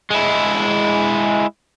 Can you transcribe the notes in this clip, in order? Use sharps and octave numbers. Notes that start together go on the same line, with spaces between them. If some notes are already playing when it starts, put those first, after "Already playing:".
G#3 E4